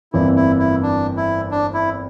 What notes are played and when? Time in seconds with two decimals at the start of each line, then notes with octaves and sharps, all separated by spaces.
0.13 G1 F2 E3 A#3 E4
0.36 E4
0.59 E4
0.83 D4
1.17 E4
1.51 D4
1.74 E4